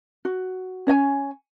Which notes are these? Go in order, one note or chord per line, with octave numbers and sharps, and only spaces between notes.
F#4
C#4 C#5 D#5 G#5